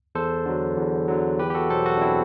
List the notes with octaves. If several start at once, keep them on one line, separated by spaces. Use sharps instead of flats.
E2 A4 C5
D3 F#3
E2
D3 F#3
E2 G4 B4
G4
F#4 A4
B2 F#3 A4 C5
F#4 A4
D4
C4 E4